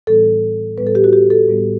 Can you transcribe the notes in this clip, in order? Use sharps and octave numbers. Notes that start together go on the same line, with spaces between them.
A2 E3 G3 B3 A4
A2 G3 B3 B4
A4
G4
F#4
G4
A4
A2 G3 B3